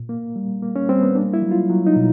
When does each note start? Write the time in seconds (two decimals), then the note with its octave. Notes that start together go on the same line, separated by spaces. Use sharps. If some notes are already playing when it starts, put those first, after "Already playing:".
Already playing: A#2
0.09 A#3
0.36 G3
0.62 A#3
0.76 C#4
0.89 G3 C4
1.03 B3
1.15 A#3 D4
1.34 E4
1.42 F#3
1.51 F4
1.70 F#3
1.87 D#4
1.96 B2